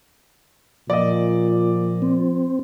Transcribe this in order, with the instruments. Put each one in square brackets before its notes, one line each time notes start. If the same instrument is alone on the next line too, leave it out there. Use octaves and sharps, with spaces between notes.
[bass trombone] A#2 [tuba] F3 [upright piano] D5 D#5
[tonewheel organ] C4